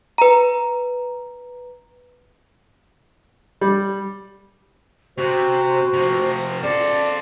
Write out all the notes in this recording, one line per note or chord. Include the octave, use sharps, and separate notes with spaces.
B4 A#5
G3
C3 F#4 C5
C3 F3
A4 C5 D5